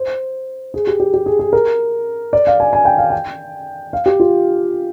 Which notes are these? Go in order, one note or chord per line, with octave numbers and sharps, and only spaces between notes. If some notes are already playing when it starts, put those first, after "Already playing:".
Already playing: C5
G#4
G4
G4
G4
G#4
G#4
A#4
D5
F5
G#5
G#5
G5
F5
G5
F5
G4
F4